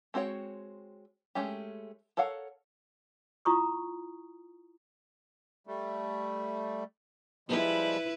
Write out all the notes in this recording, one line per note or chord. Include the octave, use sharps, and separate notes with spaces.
G#3 C4 F#4 C#5 G5
G#3 A3 C#4 G4
A4 A#4 C#5 F5 F#5
E4 F4 A#5 C#6 D#6
G3 A3
F3 G3 G#3 E4 B4